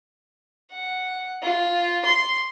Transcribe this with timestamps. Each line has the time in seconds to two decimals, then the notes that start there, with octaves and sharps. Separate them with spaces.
0.72 F#5
1.42 F4
2.05 C6